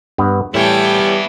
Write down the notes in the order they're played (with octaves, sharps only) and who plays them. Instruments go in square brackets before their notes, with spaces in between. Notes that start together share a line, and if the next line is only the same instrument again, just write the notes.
[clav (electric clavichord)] G2 B3
[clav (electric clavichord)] A2 [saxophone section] E3 G3 [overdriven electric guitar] B3 E4 [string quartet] C#5 G5 A5